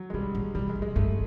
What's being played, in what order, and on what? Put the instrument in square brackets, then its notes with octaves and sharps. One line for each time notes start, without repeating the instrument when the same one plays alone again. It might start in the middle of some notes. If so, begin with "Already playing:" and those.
Already playing: [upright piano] F#3
G#3
[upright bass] B2 [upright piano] G3
[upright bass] A#2
[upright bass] B2 [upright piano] G3
[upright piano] G#3
[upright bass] A2
[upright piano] G#3
[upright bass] G2 [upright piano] A3